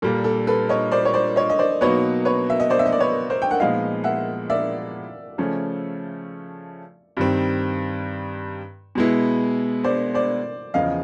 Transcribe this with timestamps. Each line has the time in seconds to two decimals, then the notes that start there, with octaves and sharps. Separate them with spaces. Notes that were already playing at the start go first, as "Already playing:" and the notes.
0.02 A#2 G3 A#3 A4
0.24 A4
0.47 A4 B4
0.69 C#5 D#5
0.91 C5 D5
1.05 C#5
1.14 C5 D5
1.36 C#5 D#5
1.50 D#5
1.59 C5 D5
1.81 B2 F#3 A#3 D#4 B4 C#5
2.25 B4 C#5
2.50 E5
2.60 D#5
2.70 C5 D5
2.79 E5
2.86 D#5
2.92 D5
3.00 B4 C#5
3.30 A#4 C5
3.42 G5
3.51 F#5
3.60 A#2 F3 G#3 B3 D#4 D#5 F5
4.04 E5 F#5
4.50 D5 E5
5.38 C#3 F3 A3 C#4
7.17 G2 D#3 G3 C4
8.95 B2 G#3 B3 E4
9.84 C5 D5
10.14 C5 D5
10.74 E2 C#3 F3 D#5 F5